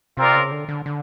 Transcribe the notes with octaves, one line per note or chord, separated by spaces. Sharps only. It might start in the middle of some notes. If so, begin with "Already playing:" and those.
C3 C4 F4 A#4 D5
C#3
D3
D3
D3